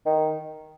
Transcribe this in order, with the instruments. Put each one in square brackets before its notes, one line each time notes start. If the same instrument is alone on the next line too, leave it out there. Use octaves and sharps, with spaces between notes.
[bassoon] D#3